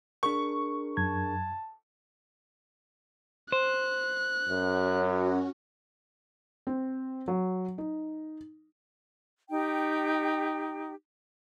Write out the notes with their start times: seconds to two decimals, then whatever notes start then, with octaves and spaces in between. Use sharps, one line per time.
0.23 D4 G#4 A#4 C#6
0.97 F#2 A5 G#6
3.52 C5 F#6
4.49 F#2 C#4 F#4
6.67 C4
7.28 F#3
7.78 D#4
9.50 D#4 G4 G5